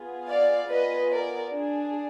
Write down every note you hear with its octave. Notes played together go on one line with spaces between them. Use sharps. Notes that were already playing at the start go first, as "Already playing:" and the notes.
Already playing: B3 F4 G#4
D5 F5
B3 F4 G#4 B4 D#5
A#4 D5
D4 G#4